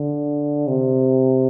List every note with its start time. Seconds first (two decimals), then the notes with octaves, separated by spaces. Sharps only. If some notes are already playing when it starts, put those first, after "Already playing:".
Already playing: D3
0.68 C3